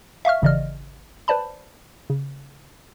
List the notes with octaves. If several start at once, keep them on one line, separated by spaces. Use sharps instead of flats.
E5 F5 C#6 F6
G#1 C#3 E3 D5 D#5 F6
B4 C5 D5 A5 B5
C#3